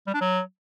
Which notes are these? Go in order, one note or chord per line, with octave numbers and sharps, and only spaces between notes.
G3
D4
F#3